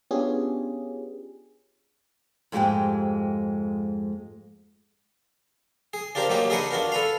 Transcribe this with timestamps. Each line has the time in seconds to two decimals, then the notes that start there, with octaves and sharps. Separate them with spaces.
0.11 B3 C#4 D4 F4 G4 G#4
2.52 F2 G#2 G#3 F#4 G4 G5
5.93 G#4
6.15 D4 F4 G4 A#4 C5
6.29 F#3 A#3 D#4 G4
6.50 D4 D#4 G#4 B4 D#5 F#5
6.71 D4 F4 F#4 A#4
6.92 A4 B4 F5